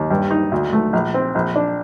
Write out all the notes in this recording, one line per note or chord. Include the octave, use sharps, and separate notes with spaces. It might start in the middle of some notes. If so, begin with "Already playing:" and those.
Already playing: D#2
G2
D#4
D2
A3
A#1
C4
A#1
D4